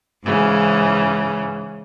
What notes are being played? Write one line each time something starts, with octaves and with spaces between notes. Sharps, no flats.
G#2 C#3 E3